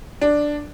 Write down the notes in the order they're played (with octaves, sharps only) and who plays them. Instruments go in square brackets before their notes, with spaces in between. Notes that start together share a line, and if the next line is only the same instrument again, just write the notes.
[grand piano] D4